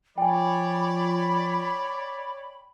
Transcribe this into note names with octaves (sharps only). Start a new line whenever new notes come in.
F3 C#5 D5 G5 G#5 B5